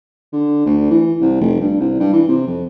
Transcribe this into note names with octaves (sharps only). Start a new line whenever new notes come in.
D3
D2
E3
C2
F1
G2
C2
G2
E3
C3
F2